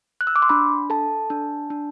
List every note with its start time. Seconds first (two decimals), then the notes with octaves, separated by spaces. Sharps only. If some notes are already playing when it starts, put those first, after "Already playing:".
0.21 F#6
0.27 E6
0.36 D6
0.42 C6
0.49 D4 B5
0.90 A4 A5
1.30 D4
1.70 D4